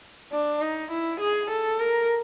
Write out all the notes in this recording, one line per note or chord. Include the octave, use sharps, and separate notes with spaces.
D4
D#4
E4
G#4
A4
A#4